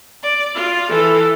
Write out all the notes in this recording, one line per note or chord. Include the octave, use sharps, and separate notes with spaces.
D5
F4
E3 A4